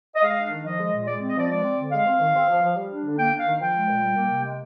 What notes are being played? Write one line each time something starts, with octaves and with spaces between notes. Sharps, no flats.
D#5
G#3 F5
D4
D#3
F3 D#5
G#3
A#2
G#3 D5
C4
D#5
F3 D5
G#3 D5
C4
D3
G#3 F5
C4
D#3
C4
F3
F3
G3
D4
D3
A#3 G5
D4
F5
D#3
F3 G5
G#3
A#2
G3
A#3
C3
G#3